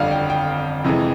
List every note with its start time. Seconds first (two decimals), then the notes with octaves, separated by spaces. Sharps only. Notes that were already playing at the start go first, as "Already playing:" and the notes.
Already playing: G1 F2 D3 G3 F5
0.11 G5
0.30 G5
0.84 F2 C3 E3 G#3